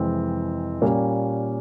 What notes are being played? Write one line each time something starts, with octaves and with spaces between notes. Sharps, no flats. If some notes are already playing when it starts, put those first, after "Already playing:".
Already playing: F2 C3 E3 G#3 C4
A#2 G3 A#3 C#4